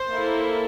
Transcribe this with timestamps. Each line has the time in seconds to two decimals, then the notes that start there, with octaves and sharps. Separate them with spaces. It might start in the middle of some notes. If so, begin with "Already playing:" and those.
Already playing: C5
0.10 A#3 E4 A4